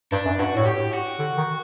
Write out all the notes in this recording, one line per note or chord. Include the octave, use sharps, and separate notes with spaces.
G2 D4
F#2
G2 F#4
A2 F#4
G4
F#4
D3
D#3